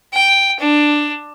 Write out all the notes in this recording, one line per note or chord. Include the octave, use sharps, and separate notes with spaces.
G5
D4